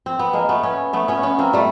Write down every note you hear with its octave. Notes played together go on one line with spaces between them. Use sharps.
C4
B3
G#3 A#3
A3 B3
B3 C#4
A3 B3
B3 C#4
B3 C#4
A#3 C4
G3 A3